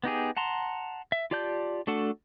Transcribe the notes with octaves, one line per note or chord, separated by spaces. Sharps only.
B3 D#4 G4 G#4
F#5 A5 A#5 C6
E5
F4 G4 D5 A5 G6
A3 D4 F#4 A4 F#5